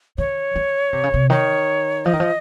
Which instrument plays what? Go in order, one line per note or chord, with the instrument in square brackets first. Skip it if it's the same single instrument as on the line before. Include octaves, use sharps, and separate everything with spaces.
[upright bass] D#3 [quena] C#5
[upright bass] D#3
C3
C#3
C3
[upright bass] D#3 [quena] C#5
[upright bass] F3 [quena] D#5
[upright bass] D#3
F3